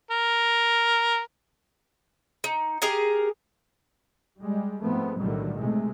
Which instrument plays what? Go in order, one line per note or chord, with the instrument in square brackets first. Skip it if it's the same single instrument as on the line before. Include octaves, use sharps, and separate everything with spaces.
[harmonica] A#4
[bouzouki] D#4
G4 G#4 A#4 G#5
[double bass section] G3 G#3
G#2 F3 A3 B3 C4
B1 A2 D3 D#3 F#3 G3
C3 G#3 A3